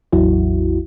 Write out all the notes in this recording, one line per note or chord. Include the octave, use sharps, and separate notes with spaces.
A1 E2 F#3 E4 F#4